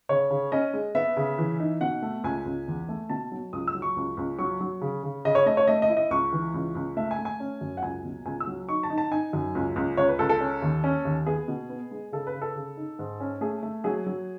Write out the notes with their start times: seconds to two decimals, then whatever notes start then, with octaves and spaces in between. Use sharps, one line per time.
0.09 C#3 C#5
0.31 C#3
0.52 C#4 D#5
0.74 G#3
0.95 B3 E5
1.17 C#3
1.38 E3
1.60 D#4
1.81 B2 F#5
2.03 A3
2.24 C#2 G#5
2.46 C#2
2.68 E2
2.89 A3
3.10 B2 A5
3.32 F#3
3.53 C#2 D#6
3.67 E6
3.75 F#3
3.82 C#6
3.96 C#2
4.17 C#2
4.39 F#3 C#6
4.61 F#3
4.81 C#3
5.03 C#3
5.25 C#3 D#5
5.35 C#5
5.46 A3 D#5
5.57 C#5
5.68 A3 D#5
5.82 D#5
5.90 E4
5.97 D#5
6.11 C#2 C#6
6.33 E3
6.54 C#2
6.75 C#2
6.97 A3 E5
7.11 G#5
7.19 A3
7.25 G#5
7.40 C#4
7.61 F#2
7.77 F#5
7.83 C#2 G#5
8.04 B2
8.26 C#2 G#5
8.40 E6
8.47 F#3
8.69 D#4 C#6
8.83 A5
8.90 D#4
8.98 A5
9.11 D#4 G#5
9.33 F#2
9.55 C#2
9.76 C#2
9.97 C#2 C#5
10.08 B4
10.19 C#2 A4
10.29 A4
10.41 C#4
10.62 D#2
10.84 C#4
11.05 D#2
11.26 B3 G#4
11.48 B2
11.69 B3
11.91 G#3
12.12 C#3 A4
12.27 B4
12.34 C#3
12.42 A4
12.56 C#3
12.77 D#4
12.99 G#2
13.20 C#4
13.41 A3 G#4
13.63 A3
13.84 F#3 G#4
14.07 F#3